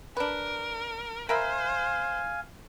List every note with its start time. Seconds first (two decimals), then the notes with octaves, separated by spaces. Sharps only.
0.17 D4 A#4 B4
1.29 A#4 C5 E5 F5 G#5 B5